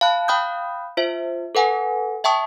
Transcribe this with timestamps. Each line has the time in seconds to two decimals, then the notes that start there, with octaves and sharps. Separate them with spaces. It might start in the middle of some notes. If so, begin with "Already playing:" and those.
0.01 F5 A5 B5 F#6
0.28 F5 G5 B5 D#6 F#6 G6
0.97 F4 C5 E5
1.55 A4 B4 F#5 G#5
2.24 E5 G5 A5 C#6 D#6